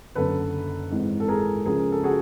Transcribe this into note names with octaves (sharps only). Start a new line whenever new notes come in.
F#1 F#2 D3 A4 B4
G#1 G#2 E3
A4
G#4 A#4
C#2 C#3 F3 G#4 A#4
A4
F#4 G#4